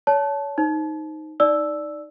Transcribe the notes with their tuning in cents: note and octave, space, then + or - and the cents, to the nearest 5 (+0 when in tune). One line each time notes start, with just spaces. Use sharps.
C#5 +30 A5 -15
D#4 +0 C5 +0
D#4 +0 D5 +0 E6 +0